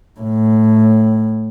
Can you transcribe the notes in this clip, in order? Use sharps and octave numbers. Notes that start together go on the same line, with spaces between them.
A2